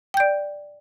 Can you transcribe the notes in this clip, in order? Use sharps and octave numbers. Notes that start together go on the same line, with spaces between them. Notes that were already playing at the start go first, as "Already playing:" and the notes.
D5 G5 G6